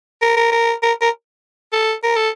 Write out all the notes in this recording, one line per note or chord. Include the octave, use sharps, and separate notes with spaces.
A#4
A#4
A#4
A#4
A#4
A4
A#4
A4